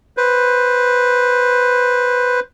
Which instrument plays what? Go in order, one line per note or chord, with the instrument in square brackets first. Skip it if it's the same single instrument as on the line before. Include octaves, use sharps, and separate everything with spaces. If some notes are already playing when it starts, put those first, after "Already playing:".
[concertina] B4 C5